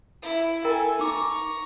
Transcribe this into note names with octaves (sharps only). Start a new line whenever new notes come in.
E4
E4 A4 A#4 G5 G#5
D#4 A#5 C#6 D6